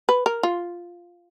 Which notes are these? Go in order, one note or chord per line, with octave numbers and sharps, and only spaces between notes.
B4
A#4
F4